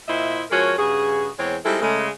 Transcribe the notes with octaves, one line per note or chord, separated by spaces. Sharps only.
A#2 E4 C5 D#5 E5
F3 G#3 C#4 F#4 A#4 C#5
G2 C#3 F#4 G#4
E2 G#3 C4 C#5
G3 G#3 C4 D#4 E4 A4
C#3 G#3 A3